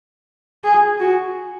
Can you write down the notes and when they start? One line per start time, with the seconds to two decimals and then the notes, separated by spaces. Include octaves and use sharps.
0.64 G#4
1.00 F#4